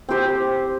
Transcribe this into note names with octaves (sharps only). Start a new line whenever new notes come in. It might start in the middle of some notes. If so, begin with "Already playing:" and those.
C4 G4 C5